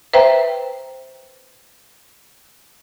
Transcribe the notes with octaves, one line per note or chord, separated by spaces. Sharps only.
B4 C5 E5 G5 A#5